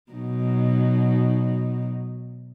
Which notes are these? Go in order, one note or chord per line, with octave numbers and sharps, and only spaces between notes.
B2 F#3 D#4